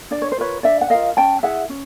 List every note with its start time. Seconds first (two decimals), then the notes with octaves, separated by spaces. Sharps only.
0.11 D4 D5
0.22 C#5
0.32 C5
0.38 F4 A#4 B4 C#5
0.63 D4 D5 E5
0.81 F#5
0.90 F4 A#4 D#5 F5
1.17 C#4 G5 A5
1.43 E4 G#4 E5 F#5
1.69 C#4